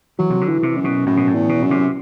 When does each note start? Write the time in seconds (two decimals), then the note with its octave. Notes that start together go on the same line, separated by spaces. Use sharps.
0.19 E3 F#3
0.30 C3
0.41 D3
0.48 E3
0.63 C3
0.77 F#2
0.84 B2
1.06 F#2 A2
1.17 B2
1.27 A2
1.34 E2
1.49 B2
1.63 F#2
1.71 C3